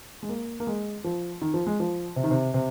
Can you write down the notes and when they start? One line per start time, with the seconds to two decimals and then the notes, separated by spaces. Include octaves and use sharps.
0.23 G#3
0.29 A#3
0.60 A#3
0.67 G#3
1.04 F3
1.42 D#3
1.54 F3
1.67 G#3
1.80 F3
2.16 C3
2.24 D#3
2.31 C3
2.54 C3